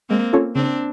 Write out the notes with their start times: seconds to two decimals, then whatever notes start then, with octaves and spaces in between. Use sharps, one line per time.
0.10 G#3 A#3 C4
0.33 C#4 F4 A4 C#5
0.55 C#3 C4 D4